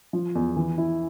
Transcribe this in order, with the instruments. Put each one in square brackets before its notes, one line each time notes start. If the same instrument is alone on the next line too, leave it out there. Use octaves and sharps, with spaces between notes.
[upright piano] F3
E2
E3
E4